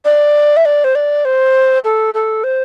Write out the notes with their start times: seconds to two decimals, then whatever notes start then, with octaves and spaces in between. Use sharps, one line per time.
0.05 D5
0.57 E5
0.65 D5
0.84 C5
0.95 D5
1.25 C5
1.84 A4
2.14 A4
2.44 C5